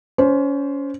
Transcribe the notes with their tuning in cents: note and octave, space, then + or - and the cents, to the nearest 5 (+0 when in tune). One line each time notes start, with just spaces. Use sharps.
C#4 +25 C5 +0